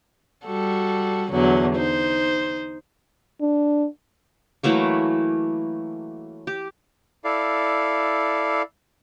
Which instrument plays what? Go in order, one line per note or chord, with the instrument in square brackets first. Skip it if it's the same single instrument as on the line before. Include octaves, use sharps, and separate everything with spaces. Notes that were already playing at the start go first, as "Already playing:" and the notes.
[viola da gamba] G3 F#4 A4
E2 D3 F#3
D#4 C5
[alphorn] D4
[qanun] E3 F#3 A3 A#3
G4
[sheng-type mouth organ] E4 A4 D5 F5